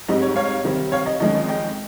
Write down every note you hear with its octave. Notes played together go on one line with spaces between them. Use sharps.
G#2 G3 C4 D#5
C#5
C#5 F5
C3 D#3 G3 C4
C#5 F5
D#5
F2 D#3 G#3 C#4 D#5
D#5
D#5 G5